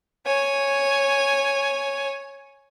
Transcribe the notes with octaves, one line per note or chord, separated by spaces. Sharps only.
C#5 G#5